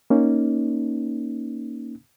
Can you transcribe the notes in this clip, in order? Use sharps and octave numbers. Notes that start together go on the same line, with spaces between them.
A#3 C#4 D#4